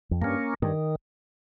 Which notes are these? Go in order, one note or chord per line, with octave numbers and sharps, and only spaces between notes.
F2
G2 A#3 C#4
G2 D#3